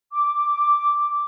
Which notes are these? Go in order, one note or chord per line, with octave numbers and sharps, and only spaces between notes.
D6